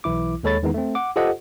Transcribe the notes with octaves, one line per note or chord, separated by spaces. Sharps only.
B1 E3 E4 D6
D#2 G#3 A4 C#5 B5 A6
E2 D#3 E3 G#3 B3 D#4
A3 C4
F#5 D6
F4 G4 A4 C5 D#5 F#5